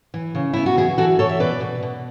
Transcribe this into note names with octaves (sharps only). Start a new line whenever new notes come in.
E3
C#3
B3 E4
F#4
E3 E4 G#4
E3 F#4 A4
E3 A4 C#5
E5
B2 B4 D5
B2
B2